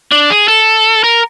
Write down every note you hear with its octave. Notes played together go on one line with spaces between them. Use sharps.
D4
G#4
A4
A#4